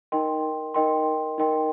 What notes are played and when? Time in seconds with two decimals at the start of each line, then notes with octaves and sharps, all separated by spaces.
0.12 D#4 A#4 D#5 G5 C6
0.74 D#4 A#4 D#5 G5 C6
1.38 D#4 A#4 D#5 G5 C6